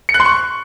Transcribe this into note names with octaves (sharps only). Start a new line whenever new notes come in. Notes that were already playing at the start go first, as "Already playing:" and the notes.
C#7
F#6
C6
C#6